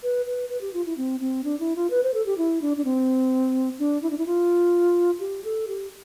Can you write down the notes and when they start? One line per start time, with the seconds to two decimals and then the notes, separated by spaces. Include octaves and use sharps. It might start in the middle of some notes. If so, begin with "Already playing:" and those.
0.03 B4
0.26 B4
0.49 B4
0.61 G4
0.74 F4
0.86 E4
0.97 C4
1.20 C4
1.44 D4
1.60 E4
1.76 F4
1.90 B4
2.03 C5
2.14 A4
2.26 G4
2.38 E4
2.62 D4
2.77 D4
2.85 C4
3.79 D4
4.02 E4
4.11 D4
4.18 E4
4.26 F4
5.20 G4
5.44 A4
5.68 G4